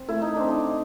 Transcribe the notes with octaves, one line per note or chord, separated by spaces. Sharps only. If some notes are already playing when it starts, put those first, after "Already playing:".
Already playing: C4
A3 E4
D#4
C4 D4
D#4